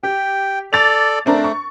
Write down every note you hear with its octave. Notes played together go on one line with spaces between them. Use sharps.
G4 G5
A4 D5 D6 A6 F7
A3 C4 D4 A#4
C#6